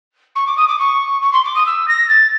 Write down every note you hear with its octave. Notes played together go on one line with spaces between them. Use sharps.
C#6
D6
D#6
D6
C#6
C#6
C6
D6
D#6
E6
A#6
A6